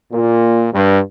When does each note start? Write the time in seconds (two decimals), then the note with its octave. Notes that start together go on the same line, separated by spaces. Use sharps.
0.12 A#2
0.73 G2